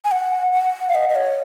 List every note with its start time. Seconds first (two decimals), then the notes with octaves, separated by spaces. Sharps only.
0.05 G#5
0.11 F#5
0.52 F#5
0.89 F5
0.95 D#5
1.09 D#5
1.15 C#5